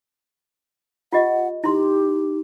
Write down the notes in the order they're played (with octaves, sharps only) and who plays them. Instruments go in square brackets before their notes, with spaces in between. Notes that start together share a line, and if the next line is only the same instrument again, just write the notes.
[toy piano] F4 G4 D#5 [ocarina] F#5
[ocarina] D#4 [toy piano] E4 C6 [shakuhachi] G4